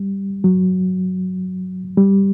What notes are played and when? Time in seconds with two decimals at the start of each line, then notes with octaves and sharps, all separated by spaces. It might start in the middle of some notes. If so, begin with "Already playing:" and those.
Already playing: G3
0.44 F#3
1.97 G3